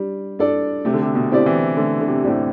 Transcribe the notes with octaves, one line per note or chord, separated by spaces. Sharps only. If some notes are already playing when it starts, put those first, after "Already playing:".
Already playing: G3 D4
D4 A4 D5
C3 A3
D3
C3
B2
C4 E4 G4 D5
E3
D3 A3
D3
C3
A2 C4 E4 G4 D5